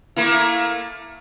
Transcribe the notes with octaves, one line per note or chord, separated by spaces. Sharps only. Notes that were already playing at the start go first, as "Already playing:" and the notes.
A3 A#3 E4